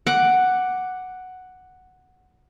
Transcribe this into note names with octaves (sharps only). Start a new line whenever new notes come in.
F#5 D6